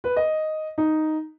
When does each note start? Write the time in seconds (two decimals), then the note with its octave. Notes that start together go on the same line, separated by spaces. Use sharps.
0.04 B4
0.17 D#5
0.78 D#4